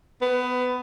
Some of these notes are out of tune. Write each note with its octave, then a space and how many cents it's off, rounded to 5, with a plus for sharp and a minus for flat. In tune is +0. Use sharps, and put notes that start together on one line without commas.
B3 +20